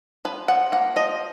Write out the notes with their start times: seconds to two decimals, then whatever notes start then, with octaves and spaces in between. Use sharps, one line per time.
0.25 F3 B4
0.48 F3 F#5
0.72 A#3 F#5
0.96 F3 D#5